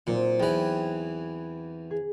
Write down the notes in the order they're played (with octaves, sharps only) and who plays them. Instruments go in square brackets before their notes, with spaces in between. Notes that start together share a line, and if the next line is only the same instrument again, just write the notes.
[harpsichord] A#2 [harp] F#3 C4 D#4
[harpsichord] E2 E3 [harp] G5
[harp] G#4